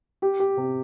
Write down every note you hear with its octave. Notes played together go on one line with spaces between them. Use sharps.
G4
G4
C3